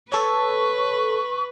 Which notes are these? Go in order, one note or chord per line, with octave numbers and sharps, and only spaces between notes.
A4 B4 C#5 C#6